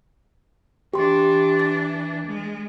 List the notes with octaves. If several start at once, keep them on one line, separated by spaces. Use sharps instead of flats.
E3 D4 G4 C6
A6
G#3